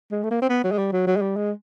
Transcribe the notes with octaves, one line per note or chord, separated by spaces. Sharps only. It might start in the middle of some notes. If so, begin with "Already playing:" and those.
G#3
A3
A#3
C4
B3
F#3
G#3
G3
F#3
F#3
G#3
G3
G#3